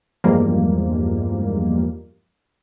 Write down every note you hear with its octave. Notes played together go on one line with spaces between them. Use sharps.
E2 G2 F3 G3 G#3 A#3